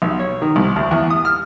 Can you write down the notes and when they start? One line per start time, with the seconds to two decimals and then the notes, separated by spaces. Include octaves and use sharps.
0.02 B1
0.20 C#5
0.42 D#3
0.56 C2
0.76 D2
0.91 E2
1.10 D#6
1.25 F6